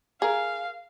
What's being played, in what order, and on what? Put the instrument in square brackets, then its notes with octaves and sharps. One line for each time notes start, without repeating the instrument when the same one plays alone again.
[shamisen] G#4 A#4 [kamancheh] F5